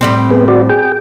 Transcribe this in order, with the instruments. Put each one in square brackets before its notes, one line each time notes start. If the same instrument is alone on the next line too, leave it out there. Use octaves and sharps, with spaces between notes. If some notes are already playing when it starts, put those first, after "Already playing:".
[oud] A2 G3 C4
[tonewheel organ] B3 G#4
F#4 D5
G#4 G5